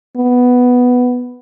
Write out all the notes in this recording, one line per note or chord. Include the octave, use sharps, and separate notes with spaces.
B3